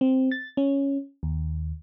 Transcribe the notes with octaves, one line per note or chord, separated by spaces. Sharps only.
C4
A6
C#4
D#2